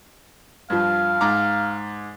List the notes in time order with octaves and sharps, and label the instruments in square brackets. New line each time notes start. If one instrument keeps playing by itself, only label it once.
[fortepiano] G2 F3 [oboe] F5
[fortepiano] G#2 A#5 D6